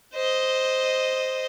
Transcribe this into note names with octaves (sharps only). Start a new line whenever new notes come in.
C5 D#5